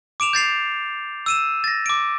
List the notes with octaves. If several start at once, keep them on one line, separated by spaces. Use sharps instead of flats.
D6 D7 E7 F7
G6 A6 C7 F7
E6 D#7 E7
A6 A#6
D6 D7